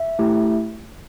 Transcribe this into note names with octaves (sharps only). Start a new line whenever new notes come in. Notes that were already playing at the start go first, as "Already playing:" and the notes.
Already playing: E5
A3 E4 G4